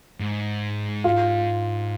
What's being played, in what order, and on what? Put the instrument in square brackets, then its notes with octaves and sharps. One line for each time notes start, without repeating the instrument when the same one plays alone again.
[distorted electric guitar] G#2
[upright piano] F4 F5